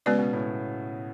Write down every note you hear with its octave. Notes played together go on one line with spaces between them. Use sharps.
C#3 G#3 B3 F#4 B4 D5
B2
A2 C#3